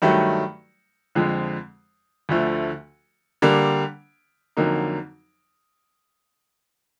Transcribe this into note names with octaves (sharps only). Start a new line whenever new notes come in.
G2 D#3 F#3 A3
F2 D3 F3 G#3
D2 D3 F3 A3
D3 G3 A#3 D4
F2 D3 F#3 A#3 D#4